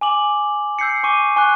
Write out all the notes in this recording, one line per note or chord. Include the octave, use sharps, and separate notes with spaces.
G#5 D6 F#7
E6 G6 C7 C#7
G#5 C#6 D6 D#7
G#5 C#6 D6 F#6